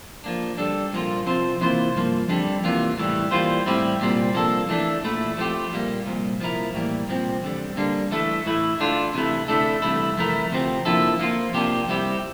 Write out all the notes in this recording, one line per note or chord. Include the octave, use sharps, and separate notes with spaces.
F3 A#3 D4
D3 G3 D4 A4
C2 A#2 F3 A#3 F4
C3 F3 C4 F4 C5
C3 E3 A#3 F4 C5
G2 F3 A#3
F2 D3 G3 D4
E2 C3 E3 A#3 F4
A2 E3 G3
E3 G3 A#3 F4 C5
A2 G3 C4 E4 G4
C2 A#2 G3 C4
F3 A#3 D4 A4
E3 A3 D4
A#2 A3 E4
F3 A3 C4 G4
A#2 G3 A#3
C2 A#2 F3
F3 A#3 E4 A#4
A2 E3 G3 A#3
C2 A#2 F3 C4
E2 D3 G3
D3 G3 A#3 D4
E3 A3 E4 A4
A2 E3 A3 E4
D3 A3 D4 F4
C3 E3 A3 E4
D3 A3 E4 A4
C2 C3 E3 A3 E4
F2 E3 A3 E4 A#4
D2 C3 F3 C4
D3 F3 A#3 E4 A4
F3 A#3 F4
C3 F3 A#3 D4 G4
C3 G3 C4 E4 G4